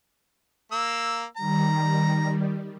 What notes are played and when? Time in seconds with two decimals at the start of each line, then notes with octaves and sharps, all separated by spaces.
0.72 A#3 E6
1.37 D#3 G3 A#5